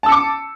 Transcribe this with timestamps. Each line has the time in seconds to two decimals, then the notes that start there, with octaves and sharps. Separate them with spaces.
0.03 A5
0.06 E6
0.09 C#7
0.12 D6